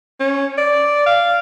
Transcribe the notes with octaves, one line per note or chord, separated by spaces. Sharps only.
C#4
D5
F5